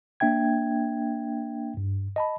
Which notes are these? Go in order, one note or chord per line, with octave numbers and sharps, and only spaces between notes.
A#3 D4 E5 G5 G#6
G2
D#5 A5 B5